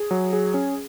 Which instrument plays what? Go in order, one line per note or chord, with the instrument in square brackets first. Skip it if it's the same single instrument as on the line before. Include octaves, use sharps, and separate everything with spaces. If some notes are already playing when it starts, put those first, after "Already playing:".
Already playing: [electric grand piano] G#4
F#3
G#4
C#4